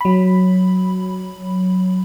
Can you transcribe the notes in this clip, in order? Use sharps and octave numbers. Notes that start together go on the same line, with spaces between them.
F#3 B5